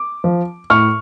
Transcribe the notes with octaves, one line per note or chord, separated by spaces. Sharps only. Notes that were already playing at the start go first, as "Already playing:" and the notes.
Already playing: D6
F3
A2 C#6 F6